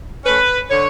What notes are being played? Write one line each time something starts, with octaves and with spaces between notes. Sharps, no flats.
A3 C#4 B4
D3 C#5